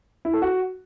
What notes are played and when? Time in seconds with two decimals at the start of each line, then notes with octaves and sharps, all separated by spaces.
0.25 E4
0.33 A4
0.42 F#4